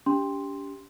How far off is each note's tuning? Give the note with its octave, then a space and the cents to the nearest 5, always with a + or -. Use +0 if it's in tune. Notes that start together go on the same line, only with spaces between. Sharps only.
D4 -45 G4 +0 C6 +0